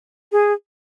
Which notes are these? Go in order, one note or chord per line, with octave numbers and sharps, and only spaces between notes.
G#4